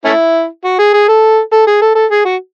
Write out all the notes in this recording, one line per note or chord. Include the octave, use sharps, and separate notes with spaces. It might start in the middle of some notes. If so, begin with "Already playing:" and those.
A3 C#4 E4
F#4
G#4
G#4
A4
A4
G#4
A4
A4
G#4
F#4